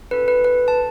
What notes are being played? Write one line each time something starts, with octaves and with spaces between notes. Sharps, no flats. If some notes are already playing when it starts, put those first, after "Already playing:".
C#4 F#4 A4 B4
B4
B4
A5